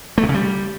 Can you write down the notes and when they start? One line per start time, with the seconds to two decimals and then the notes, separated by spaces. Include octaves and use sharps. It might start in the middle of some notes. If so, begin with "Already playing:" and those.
0.18 A3
0.23 C3
0.29 C#3
0.34 G3